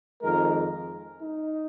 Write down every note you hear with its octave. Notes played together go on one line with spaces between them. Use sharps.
F2 D#3 G#3 A#4
D#4